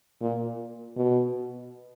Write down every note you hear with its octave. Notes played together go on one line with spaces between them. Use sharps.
A#2
B2